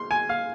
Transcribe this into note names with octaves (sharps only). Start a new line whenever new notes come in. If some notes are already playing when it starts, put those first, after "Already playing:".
Already playing: C6
G#5
F5